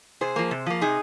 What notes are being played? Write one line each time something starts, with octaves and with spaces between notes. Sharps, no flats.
C3 G#4 C5
F3 A#3
C3
F3 A#3
C3 D#4 G#4